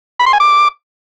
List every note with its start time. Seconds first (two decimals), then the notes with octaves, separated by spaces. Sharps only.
0.20 B5
0.26 C6
0.33 G#5
0.40 D6